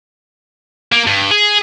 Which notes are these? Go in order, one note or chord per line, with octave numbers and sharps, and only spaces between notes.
A#3
G2
G#4